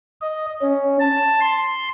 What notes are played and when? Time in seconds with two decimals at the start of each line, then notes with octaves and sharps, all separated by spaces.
0.21 D#5
0.62 C#4
1.00 A5
1.41 C6